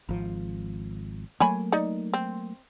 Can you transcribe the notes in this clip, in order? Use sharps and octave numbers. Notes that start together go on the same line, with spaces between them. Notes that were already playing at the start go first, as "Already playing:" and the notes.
G#1 F3
F#3 A3 A#3 C#5 G#5 B5
D#4 D5
C4